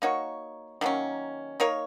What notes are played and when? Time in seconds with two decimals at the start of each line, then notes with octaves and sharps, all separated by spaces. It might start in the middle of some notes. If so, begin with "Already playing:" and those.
0.02 A#3 D#4 F#4 C#5
0.81 D#3 F#3 A#3 C#4
1.60 A#3 D#4 A#4 C#5